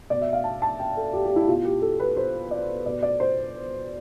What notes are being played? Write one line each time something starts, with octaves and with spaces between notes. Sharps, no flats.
B2 D5
E5
F5
A5
A5
G5
A4
G4
G4
E4
B2 F4
G4
A4
B4
C5
D5
B2 D5
D5
C5